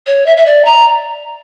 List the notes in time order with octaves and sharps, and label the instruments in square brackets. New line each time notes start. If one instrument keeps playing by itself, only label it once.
[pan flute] C#5
E5
E5
D5
A#5